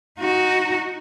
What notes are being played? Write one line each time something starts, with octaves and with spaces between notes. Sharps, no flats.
D#4 F#4